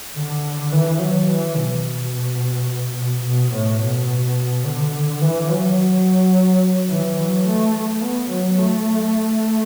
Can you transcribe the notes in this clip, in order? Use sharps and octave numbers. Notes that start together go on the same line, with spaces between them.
D3
E3
F#3
E3
B2
B2
B2
A2
B2
D3
E3
F#3
E3
F#3
A3
A3
B3
F#3
A3